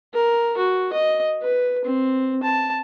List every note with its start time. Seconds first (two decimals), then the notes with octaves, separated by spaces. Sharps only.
0.14 A#4
0.57 F#4
0.92 D#5
1.42 B4
1.84 C4
2.43 A5